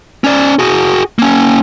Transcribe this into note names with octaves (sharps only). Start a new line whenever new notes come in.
C#4 D5
F#4 G#4
A#3 C#4